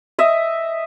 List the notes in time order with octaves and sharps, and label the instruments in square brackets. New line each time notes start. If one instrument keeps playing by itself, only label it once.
[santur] D#5 E5